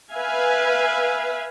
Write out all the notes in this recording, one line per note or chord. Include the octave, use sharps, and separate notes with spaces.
B4 E5 F5 G#5